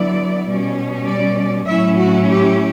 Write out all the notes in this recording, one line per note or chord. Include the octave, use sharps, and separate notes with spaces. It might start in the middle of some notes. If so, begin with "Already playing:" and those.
Already playing: D3 F#3 B3 E4 D5
B2 G3 C#4
D5
A2 F#3 C#4 E4 E5
F#4
G4